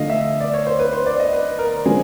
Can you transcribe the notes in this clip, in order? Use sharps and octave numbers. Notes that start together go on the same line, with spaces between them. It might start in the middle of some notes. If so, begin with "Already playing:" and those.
Already playing: D3 F3 A3 D#5 F5
E5
D5
C#5
C5
B4
C5
D5
D#5
B4
A#4
D3 F3 G#3 C4 G#4